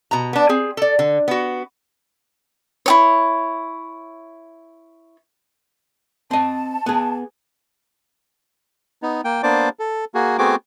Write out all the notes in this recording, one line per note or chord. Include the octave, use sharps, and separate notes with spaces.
B2 A#5
B3 D4
C4 G#4
A4 D5
D3
B3 F#4
E4 F#4 C#5
C4 D#5 A5
B3 G#4
B3 D#4
A#3 G5
A#3 B3 D4 C5 D5 D6
A4
A#3 F#4 G#4
A3 B3 C4 F#4 G#4 D6